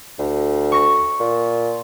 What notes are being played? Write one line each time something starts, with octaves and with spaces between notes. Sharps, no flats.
D2
C#6 A#6
A#2